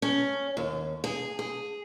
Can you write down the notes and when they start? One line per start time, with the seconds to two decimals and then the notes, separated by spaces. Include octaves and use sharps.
0.02 C#4
0.57 D#2
1.04 G#4
1.39 G#4